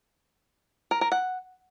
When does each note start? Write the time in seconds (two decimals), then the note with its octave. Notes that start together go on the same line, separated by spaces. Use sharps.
0.91 A#4
1.01 A#4
1.12 F#5